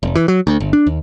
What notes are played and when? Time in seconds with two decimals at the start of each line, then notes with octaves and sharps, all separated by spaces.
0.03 F1
0.15 E3
0.28 F#3
0.47 D2
0.60 G1
0.73 D4
0.87 D#2